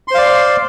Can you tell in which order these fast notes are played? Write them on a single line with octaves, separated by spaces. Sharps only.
C6 C5 F5 D5